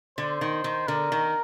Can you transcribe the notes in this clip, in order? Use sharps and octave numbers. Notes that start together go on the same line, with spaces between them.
D3 C5
D#3
D#3
D3 A#4
D#3